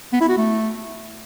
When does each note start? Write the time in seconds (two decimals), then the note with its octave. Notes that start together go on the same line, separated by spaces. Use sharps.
0.13 B3
0.21 E4
0.29 F#4
0.37 A3